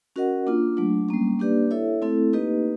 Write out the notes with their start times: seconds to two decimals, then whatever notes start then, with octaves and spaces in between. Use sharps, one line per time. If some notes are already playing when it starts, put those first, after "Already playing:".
0.16 C#4 F#4 A#4 D#5 F#5
0.47 A#3 D4 F4
0.77 F#3 A3 D4
1.09 G3 A#3 C#4
1.39 A#3 D4 G4 B4 D5
1.71 E4 A4 C#5 E5
2.02 A3 C4 E4 A4
2.33 A#3 D#4 G4 B4 D#5